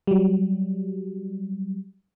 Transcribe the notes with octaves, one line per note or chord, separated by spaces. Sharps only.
F#3 G3